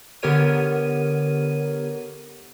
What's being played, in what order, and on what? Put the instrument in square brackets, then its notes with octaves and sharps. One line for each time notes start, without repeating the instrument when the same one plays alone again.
[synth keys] D3 B3 G4 A#4 C#5 D#7